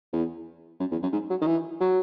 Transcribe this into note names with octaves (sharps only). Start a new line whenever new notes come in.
E2
F#2
E2
F#2
G#2
F#3
D#3
E3
F#3